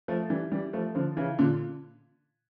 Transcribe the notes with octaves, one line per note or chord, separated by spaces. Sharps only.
F3 A3
E3 G3
E3 G3
F3 A3
D3 F3
C#3 E3
A#2 D3